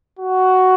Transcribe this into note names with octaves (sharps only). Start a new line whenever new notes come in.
F#4